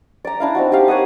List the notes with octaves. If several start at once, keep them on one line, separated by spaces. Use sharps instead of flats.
D5 A#5
D4 E4 F5
C4 D#4 F#4
G4 F5
A#4 C#5 F#5 D#6